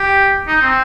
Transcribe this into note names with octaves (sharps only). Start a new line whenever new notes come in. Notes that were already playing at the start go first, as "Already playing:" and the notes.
Already playing: G4
D#4
C4